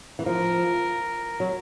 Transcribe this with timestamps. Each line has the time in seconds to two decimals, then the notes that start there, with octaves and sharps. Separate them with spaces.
0.19 E3
0.26 F3 A#4
1.40 F#3